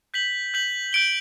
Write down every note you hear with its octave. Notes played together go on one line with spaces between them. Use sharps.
G6 B6 F#7
G6 B6 F#7
G6 D7 G7